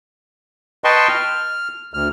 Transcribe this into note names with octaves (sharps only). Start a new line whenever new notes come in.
B4 D#5 G5 A5 C6 C#6
F6
D2 F6